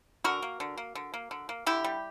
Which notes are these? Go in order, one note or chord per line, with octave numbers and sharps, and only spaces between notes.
D3 F#4 A#4
A#3
D3
A#3
D3
A#3
D3
A#3
D3 E4 G4
G3